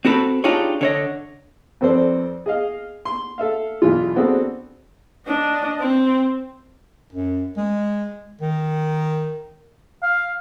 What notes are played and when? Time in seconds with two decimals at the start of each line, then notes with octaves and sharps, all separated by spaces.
0.05 C4 F#4 A4 B4
0.44 D4 D#4 F4 G4 G#4 C#5
0.81 D3 C#5 D#5
1.81 F2 C4 A4 B4 C5 D5
2.46 G#4 D#5 F5
3.05 C6
3.38 A4 E5 F5
3.82 B1 E2 E3 F4
4.16 B3 C4 D4 F#4 G#4 A4
5.27 D4 D#5
5.80 C4
7.13 F#2
7.57 G#3
8.41 D#3
10.03 F5